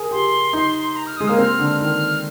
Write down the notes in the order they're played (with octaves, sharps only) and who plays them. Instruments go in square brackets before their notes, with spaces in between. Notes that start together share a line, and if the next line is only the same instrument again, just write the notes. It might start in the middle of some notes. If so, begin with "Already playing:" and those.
Already playing: [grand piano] G#4 A#4
[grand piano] G4 [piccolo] C6
[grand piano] D#4
[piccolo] A#5
F6
[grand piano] G#3 [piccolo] D#6
[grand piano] A#3 [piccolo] F6
[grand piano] C4 [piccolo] F6
[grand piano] D3
[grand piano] D#3 [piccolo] F6